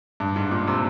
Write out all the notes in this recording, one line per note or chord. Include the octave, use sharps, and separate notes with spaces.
G2
G#2
A#2
C3